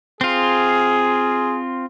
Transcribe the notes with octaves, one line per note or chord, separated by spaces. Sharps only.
C4 F4 G#4